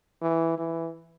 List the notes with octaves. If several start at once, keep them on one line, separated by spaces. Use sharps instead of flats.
E3
E3